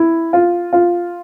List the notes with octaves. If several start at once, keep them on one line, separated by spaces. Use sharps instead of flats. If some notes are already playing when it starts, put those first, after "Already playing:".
Already playing: E4
F4
F4